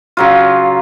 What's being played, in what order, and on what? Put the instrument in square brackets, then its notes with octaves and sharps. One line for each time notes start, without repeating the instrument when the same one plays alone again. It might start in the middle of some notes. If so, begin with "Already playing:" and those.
[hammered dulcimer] C#3 F#3 F4